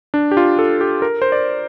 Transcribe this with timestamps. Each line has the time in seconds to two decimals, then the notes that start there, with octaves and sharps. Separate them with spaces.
0.14 D4
0.31 G4
0.37 F4
0.59 A4
0.81 G4
1.02 A#4
1.22 C5
1.32 D5